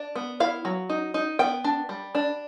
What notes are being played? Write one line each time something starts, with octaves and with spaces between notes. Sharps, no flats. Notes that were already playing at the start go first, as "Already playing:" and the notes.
Already playing: D4
B3
E4 F5
F#3
D#4
D#4
B3 G5
D4
G3
D4